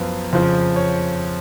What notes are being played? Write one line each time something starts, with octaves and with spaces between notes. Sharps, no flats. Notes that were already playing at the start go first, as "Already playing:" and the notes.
Already playing: F#2 F3 B3 F4
F2 C#3 F3
C#5